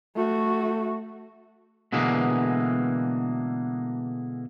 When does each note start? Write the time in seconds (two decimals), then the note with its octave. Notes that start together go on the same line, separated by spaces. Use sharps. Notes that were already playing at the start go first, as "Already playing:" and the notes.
0.16 A3 F#4
1.92 B2 D3 E3 G#3 A#3